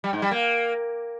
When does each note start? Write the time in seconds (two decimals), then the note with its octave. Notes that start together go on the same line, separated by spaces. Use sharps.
0.04 G3
0.13 G#2
0.22 G3
0.31 A#3